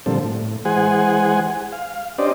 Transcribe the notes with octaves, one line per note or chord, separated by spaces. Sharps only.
A#2 D3 F3 G3 C4 A4
A2
E3 G#3 G#4 C5 F#5 G#5
F5
C#4 D4 G4 C5 D5 D#5